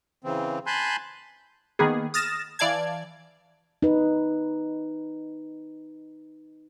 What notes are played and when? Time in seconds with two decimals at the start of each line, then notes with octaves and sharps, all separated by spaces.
0.24 C#3 E3 C4
0.67 G#5 A5 B5 C6 F#6 G6
1.79 D#3 A#3 B3 G#4
2.14 D#6 F6 A6 A#6 E7
2.59 E3 D5 F5 A5 G#6
3.82 D#4 B4